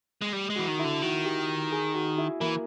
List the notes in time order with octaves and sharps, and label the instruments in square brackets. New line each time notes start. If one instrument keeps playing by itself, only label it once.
[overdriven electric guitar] G#3
G3
G#3
[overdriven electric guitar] E3 [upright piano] F#4
[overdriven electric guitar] D#3
[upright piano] E4
[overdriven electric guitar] D3
[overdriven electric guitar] D#3 [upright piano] F#4
[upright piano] G4
G#4
F#4
E4
[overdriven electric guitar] E3 [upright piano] A#3